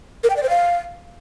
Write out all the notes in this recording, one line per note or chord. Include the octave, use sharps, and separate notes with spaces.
A#4
G5
D5
C5
F5